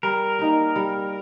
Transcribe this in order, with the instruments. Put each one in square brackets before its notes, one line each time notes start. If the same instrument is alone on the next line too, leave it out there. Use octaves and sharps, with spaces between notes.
[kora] G3 [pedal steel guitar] A#4
[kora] A#3 D#4 G4
G3